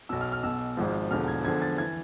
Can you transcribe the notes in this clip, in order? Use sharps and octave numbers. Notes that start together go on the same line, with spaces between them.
B1 B2 E6
F6
F6
B1 B2 E6
G#1 G#2 F3
E1 E2 D3 F3 F6
G#6
E2 D3 F3 G#6
G#6
A6
E3 G#6